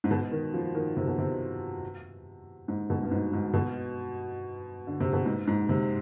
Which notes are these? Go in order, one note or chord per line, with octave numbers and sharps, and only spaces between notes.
G#2
B2
D#3
F3
D#3
C3
B2
C3
G#2
B2
G2
G#2
G#2
B2
D3
C3
B2
G#2
G#2
C3